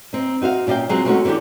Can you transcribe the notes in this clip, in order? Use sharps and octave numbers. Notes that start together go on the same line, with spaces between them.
C4 D#4
D#4 F#4 C5 F5
A#2 C#4 D5 F5 G5
F#3 G#3 C4 F4 G#4
G#3 A3 C4 C#4 D#4 F#4
D3 E3 C#4 D4 G4